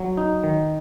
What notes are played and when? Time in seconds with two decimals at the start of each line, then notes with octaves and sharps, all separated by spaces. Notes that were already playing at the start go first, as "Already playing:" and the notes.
Already playing: F#3
0.17 D#4
0.43 D#3